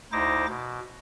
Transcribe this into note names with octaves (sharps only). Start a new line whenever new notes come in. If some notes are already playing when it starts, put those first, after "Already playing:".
D2 D#4 E4 C5 D6 A#6
B2